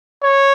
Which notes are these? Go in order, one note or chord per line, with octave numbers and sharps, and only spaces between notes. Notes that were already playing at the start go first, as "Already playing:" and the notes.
C#5